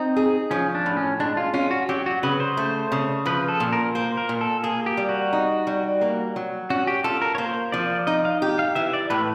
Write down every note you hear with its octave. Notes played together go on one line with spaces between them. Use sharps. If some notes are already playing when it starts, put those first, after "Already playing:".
Already playing: C4 D#4
G#4
F3 C#4
D4
A2
C#4
G#3 D4
F4
C#4 F4
F#4
F#3 G4
F#4
C#3 B4
C5
A3
C#3
F3 B4
A4
A#2
A#4
A#3 C5
A#4
A#2
A4
A#3 G#4
G4
G3
F#4
D#4
G3
A#3
F#3
C#4 F#4
G4
F4 A4
A#4
C#5
A#3 C5
F3 D5
D#4 D#5
F5
G4
F5
E3 E5
D5
A2 B4